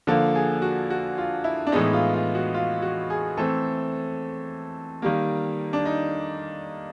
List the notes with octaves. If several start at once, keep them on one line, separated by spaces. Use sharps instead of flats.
D3 F3 A#3 A4
G#4
F#4
F#4
F4
E4
D4
A2 E3 G#3 B3 D#4
F4
F4
F#4
F4
F#4
G#4
E3 A3 C4 A4
D#3 G3 A#3
D4
D#4